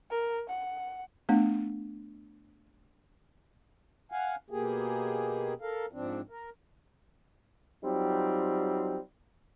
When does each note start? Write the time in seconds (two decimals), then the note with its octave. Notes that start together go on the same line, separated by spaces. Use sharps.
0.11 A#4
0.49 F#5
1.29 A3 B3 D4
4.12 F5 F#5 G#5
4.50 B2 A#3 G4 G#4
5.61 A4 A#4 F5
5.92 G#2 F3 C4 D4
6.30 A#4
7.84 F#3 G3 C4 D#4 F4